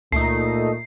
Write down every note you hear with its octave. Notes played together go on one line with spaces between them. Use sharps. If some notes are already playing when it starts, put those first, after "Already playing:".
C#2 A#2 A3 D#4 C7